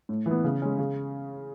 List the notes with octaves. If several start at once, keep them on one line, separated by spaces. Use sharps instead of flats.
A2
E3 B3
C#3
G#3 C#4
C#3